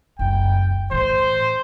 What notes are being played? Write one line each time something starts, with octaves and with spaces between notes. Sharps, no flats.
F#1 C2 G5
A2 E3 C5